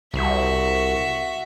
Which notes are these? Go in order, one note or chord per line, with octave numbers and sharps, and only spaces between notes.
C2 F#4 E5